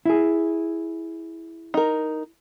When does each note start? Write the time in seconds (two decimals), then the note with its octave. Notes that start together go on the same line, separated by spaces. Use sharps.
0.06 E4 G#4
1.74 D#4 A#4